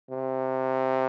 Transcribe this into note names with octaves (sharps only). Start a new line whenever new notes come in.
C3